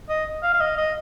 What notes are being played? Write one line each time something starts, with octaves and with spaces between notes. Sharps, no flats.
D#5
F5
F5
D#5
D#5